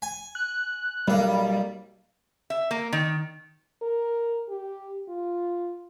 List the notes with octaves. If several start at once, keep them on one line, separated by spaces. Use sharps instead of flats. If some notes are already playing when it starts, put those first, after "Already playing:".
G#5
F#6
B1 G3 A#3
E5
A#3
D#3
A#4
G4
F4